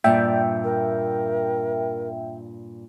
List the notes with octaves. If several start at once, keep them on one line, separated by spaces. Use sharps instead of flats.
G2 A#2 D5 E5 G5
A#4